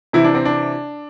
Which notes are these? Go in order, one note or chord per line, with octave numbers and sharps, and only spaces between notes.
C3 E3 E4
D4
C4
D4